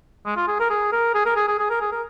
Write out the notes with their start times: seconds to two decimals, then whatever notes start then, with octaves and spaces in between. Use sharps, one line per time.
0.25 G#3
0.37 F4
0.48 G#4
0.60 A#4
0.70 G#4
0.92 A#4
1.14 G#4
1.25 A#4
1.36 G#4
1.47 G#4
1.59 G#4
1.70 A#4
1.81 G#4
1.92 A#4